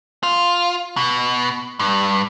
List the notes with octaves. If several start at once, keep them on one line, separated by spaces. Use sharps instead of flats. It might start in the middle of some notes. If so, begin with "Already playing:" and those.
F4
B2
G2